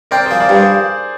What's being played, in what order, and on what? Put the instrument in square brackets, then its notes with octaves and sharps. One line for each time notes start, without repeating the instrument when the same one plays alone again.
[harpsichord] C4 [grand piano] A#4 D5
[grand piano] G#4 C5
[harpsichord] F3
[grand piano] A#4 D5
[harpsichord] G2
[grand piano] G#4 C5